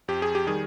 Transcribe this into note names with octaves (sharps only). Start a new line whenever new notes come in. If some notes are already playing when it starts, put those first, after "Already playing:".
F2 G4
G#4
G4
D#3 G3 G#4